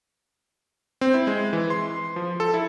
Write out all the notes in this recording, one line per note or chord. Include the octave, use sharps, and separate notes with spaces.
C4
E4
G#3
E3
C6
F3
A4
E4